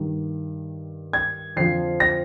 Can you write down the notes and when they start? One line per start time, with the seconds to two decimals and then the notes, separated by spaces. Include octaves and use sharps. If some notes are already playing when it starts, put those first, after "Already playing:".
Already playing: G2 D#3
1.13 G#6
1.56 F2 D3 F3 C7
2.00 A#6